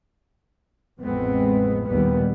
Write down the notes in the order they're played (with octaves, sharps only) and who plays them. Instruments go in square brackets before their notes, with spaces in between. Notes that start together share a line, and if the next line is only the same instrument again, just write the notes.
[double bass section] A1 F2 G#3 B3 C4
A#1 D#2 G3 B3